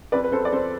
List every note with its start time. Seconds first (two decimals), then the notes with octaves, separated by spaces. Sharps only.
0.12 F2 B4 D5
0.24 B4
0.32 F2 A4 C5
0.45 D5
0.52 F2 A4 C5